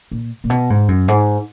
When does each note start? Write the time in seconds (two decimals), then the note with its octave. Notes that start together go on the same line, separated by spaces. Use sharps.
0.11 A#2
0.44 A#2
0.50 B2
0.70 G#2
0.88 F#2
1.08 G#2